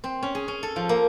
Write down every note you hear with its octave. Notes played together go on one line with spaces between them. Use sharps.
C4
C#4
G#4
C#4
A4
F3
A#3